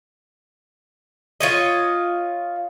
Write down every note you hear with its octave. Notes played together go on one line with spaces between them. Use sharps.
F4 C#5 D#5